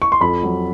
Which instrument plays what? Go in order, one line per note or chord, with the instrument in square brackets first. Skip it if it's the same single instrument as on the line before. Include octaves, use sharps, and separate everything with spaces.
[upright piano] C#6
C6
F2 B5
F#3